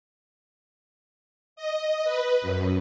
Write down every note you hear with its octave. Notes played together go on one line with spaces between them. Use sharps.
D#5
B4
F#2